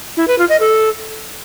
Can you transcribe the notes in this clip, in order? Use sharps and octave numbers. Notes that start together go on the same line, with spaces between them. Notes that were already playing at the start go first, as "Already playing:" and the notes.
E4
B4
F4
D#5
A4